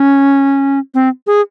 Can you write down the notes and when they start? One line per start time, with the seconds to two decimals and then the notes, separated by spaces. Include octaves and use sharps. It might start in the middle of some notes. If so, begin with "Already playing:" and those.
Already playing: C#4
0.94 C4
1.27 G#4